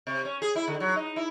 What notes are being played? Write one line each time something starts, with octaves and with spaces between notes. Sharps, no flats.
C3
C#4
G#4
E4
D3
F#3
D#4
E4